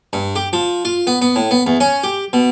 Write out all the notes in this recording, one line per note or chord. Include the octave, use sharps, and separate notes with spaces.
G2
G4
F3
F4
B3
B3
A2
B3
E2
C#4
G4
B2